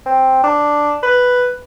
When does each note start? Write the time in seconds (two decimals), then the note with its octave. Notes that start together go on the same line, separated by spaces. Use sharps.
0.06 C4
0.43 D4
1.03 B4